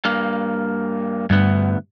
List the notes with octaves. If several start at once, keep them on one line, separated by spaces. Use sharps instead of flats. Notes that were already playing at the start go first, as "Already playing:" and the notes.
G2 A#3
D2 G2 B3